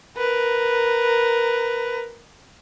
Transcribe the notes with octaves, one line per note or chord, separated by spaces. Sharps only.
A#4 B4